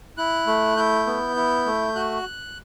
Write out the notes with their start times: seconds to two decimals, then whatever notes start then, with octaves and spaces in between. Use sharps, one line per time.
0.18 E4 F#6
0.47 A3
0.77 E4 G6
1.07 B3
1.36 E4
1.66 A3
1.95 F#4 F#6